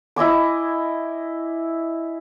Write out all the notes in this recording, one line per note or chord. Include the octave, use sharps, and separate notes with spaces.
E4 D#5 G#5 D6